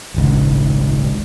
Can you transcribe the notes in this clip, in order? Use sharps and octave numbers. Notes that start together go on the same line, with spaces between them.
D#1 G#1 C#2